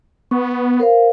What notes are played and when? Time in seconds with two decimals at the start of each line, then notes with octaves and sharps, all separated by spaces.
0.31 B3 C#6
0.80 A#4 C5 F5